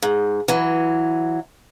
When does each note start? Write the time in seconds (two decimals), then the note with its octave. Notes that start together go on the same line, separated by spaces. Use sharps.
0.02 G#2
0.48 E3 F#3